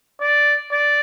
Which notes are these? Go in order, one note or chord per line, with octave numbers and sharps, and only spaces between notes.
D5
D5